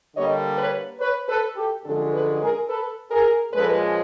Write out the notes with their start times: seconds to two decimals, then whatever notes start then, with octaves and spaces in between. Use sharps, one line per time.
0.16 D3 G3 A#3 C#5 D#5
0.58 B4 C#5
1.00 B4 C#5
1.28 A4 B4
1.56 G4 A4
1.85 F#2 D3 F3 G#3 C#4 G4 A4
2.13 A4 B4
2.41 G#4 A#4
2.69 A4 B4
3.11 G#4 A#4
3.53 A#2 F3 G#3 C#4 A4 B4